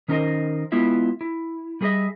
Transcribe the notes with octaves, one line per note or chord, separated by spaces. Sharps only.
D#3 C#4 D#4 A#4 C5 D#5
G#3 B3 E4 F4 E5
E4
G3 A3 G#4 B4 D#5 E5